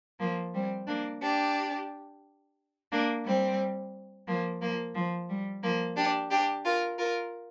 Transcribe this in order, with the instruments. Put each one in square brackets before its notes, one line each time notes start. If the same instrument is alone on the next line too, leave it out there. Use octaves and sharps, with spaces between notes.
[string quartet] F3 A#3
G3 C4
A#3 D4
D4 G4
A#3 D4
G3 C4
F3 A#3
F3 A#3
F3
G3
F3 A#3
D4 G4
D4 G4
F4 A#4
F4 A#4